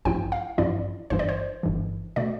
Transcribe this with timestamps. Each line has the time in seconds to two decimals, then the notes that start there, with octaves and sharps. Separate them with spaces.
0.05 A1 G2 F3 C4 E4 G5
0.32 F5
0.58 A1 G2 F3 C4 E4 D5
1.10 G1 G2 E3 C5
1.19 D5
1.29 C5
1.63 G1 G2 E3
2.16 B2 A3 D5